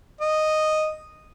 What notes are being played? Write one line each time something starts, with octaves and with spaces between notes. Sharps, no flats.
D#5